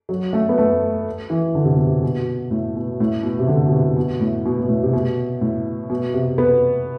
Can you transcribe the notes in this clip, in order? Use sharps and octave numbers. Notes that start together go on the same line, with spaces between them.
F#3
A3
B3
A3
E3
D3
C3
B2
C3
B2
A2
B2
A2
B2
C3
D3
B2
C3
B2
A2
B2
B2
A2
C3
B2
A2
B2
C3
B3